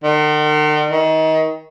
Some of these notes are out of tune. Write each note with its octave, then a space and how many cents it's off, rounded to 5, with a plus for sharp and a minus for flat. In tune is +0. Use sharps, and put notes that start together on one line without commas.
D#3 -45
D#3 +30